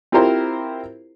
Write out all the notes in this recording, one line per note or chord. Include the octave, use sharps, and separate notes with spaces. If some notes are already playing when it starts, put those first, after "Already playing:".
C4 E4 F4 G4 A#4 C5